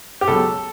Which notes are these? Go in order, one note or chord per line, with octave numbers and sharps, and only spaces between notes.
G4
C#2 B2 F#3 A4